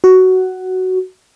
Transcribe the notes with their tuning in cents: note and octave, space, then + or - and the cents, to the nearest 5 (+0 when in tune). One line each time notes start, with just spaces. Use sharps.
F#4 +10